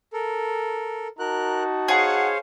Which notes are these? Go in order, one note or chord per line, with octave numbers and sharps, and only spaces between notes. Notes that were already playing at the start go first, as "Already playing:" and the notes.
A4 A#4
D#4 F#4 A#4 A5 F#6
G#4 C5 C#5 F5 F#5